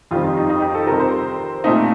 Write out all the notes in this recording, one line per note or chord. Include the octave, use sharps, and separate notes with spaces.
F2 D#3 G3 C4 F4
D#4
D#4
D#4
G4
A4
C3 G3 C4 A#4
C5
A#2 A3 C4 D#4